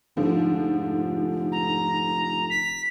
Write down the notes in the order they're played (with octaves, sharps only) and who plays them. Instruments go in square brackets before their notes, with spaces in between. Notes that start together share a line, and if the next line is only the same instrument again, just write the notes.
[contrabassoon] F1 [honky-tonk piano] G#2 D3 F3
[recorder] A#5
B6